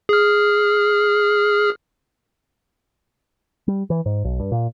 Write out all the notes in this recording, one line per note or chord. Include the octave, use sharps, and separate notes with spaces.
G#4 F6
G3
E3
G#2
B1
G2
A#2